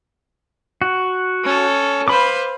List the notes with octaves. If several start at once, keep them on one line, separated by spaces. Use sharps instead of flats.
F#4
C#4 A4
B4 C5 F5 B5 D6